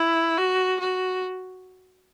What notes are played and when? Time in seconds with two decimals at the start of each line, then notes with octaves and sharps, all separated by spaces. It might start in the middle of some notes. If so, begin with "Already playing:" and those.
Already playing: E4
0.38 F#4
0.80 F#4